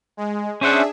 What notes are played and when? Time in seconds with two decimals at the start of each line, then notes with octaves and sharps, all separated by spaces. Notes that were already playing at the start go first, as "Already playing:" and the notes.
0.17 G#3
0.61 C#4 D4 G#4 C5 E5 F#5